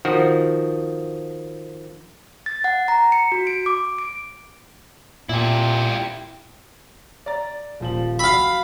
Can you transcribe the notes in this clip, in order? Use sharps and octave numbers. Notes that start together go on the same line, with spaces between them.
D#3 F3 F#4
A6
F#5
A#5
C#7
F#4
D7
D6
D7
A#2 E4 G4
D5 A#5 A6
D#1 F3 F#7
F#4 F5 G5 B5 E6